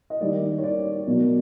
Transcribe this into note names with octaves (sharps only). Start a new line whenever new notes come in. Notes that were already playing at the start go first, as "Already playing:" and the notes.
D#5
D#3 G3 A#3 D5
C#5
D5
B2 F#3 A#3